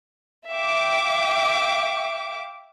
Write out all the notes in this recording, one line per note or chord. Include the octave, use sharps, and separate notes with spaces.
E5 F5 G5 D6